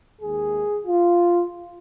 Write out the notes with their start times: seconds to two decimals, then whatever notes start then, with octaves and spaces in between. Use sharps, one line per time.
0.21 D#2 D#3 G#3 G#4
0.86 F4